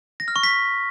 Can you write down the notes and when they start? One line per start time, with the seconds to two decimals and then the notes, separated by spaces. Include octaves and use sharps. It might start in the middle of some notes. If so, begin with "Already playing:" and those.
0.20 A#6
0.28 F6
0.36 C#6
0.43 B6